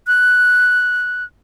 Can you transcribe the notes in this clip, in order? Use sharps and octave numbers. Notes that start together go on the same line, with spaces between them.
F#6